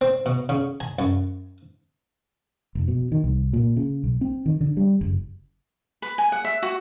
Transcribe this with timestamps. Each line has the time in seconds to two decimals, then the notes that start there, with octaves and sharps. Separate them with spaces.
0.01 C4
0.26 B2
0.49 C#3
0.80 G#5
0.99 F#2
2.75 F1
2.88 B2
3.12 D#3
3.24 C2
3.53 A#2
3.77 C#3
4.04 B1
4.21 C4
4.46 D#3
4.61 D3
4.77 G3
5.01 F#1
6.02 B4
6.18 G#5
6.32 F#5
6.45 E5
6.63 F#4